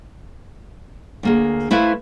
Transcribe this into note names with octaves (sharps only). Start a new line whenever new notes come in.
D2 A#3 G#4
A3 E4 A4 B4 C5 F5